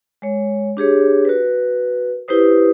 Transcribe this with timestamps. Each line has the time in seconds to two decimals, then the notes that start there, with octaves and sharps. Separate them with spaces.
0.22 G#3 C#5
0.77 D4 G4 G#4 C#5
1.25 F#4 A#4 B4
2.28 E4 G4 B4 C5 D#6